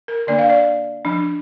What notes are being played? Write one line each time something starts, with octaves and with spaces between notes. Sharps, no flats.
A#4
D3 A#3 D4 D5
F5
D5
F3 D4